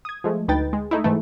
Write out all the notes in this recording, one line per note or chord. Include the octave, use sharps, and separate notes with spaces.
D#6 G#6
F3 G#3 A3
D2 D#4 B4 G5 A6
G#3
A3 D#4 E4
G#2 E3 A3